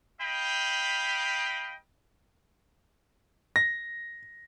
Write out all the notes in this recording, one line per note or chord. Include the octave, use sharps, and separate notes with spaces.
D#5 F5 G5 B5
A#6